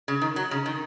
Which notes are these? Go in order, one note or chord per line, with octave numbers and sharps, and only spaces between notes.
C#3
D#3
F#3
C#3
D#3